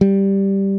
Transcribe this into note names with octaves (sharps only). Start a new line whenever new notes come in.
G3